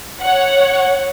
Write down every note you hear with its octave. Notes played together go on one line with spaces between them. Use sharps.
C#5 F#5